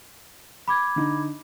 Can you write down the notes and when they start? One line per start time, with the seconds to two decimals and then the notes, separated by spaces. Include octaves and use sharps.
0.68 B5 D6 G#6
0.96 D3 D#4